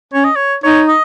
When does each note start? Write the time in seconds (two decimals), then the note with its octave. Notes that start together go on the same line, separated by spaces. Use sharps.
0.13 C#4 C#5
0.24 D#5
0.36 C#5
0.63 D#4 C#5
0.88 D#5